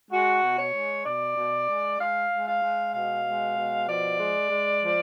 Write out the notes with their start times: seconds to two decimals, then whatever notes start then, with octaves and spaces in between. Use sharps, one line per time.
0.11 G#3 F#4
0.42 B2
0.57 C#5
0.73 G#3
1.05 B2 D5
1.36 B2
1.67 G#3
1.99 G#3 F5
2.30 G#3
2.46 F5
2.61 G#3
2.92 B2 F5
3.24 G#3
3.56 B2
3.87 F3 D5
4.18 G#3
4.49 G#3
4.81 F3